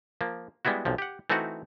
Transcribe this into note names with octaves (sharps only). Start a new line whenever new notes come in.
F3 A#3
G3 G#3 B3 E4 F#4
B1 C3 F3
G4 F#5
E3 A3 C4 D#4 F#4